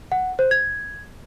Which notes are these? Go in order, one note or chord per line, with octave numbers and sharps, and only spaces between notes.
F#5
C5
G#6